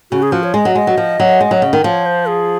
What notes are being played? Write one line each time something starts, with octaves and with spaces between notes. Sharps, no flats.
C#3 F#4
G#4
F3 F#4
C#5
G#3 D#5
F#3
G#3 D#5
F#3
F3
F#3
G#3
F#3
C#3
D#3
F3 C#5
C5
G#4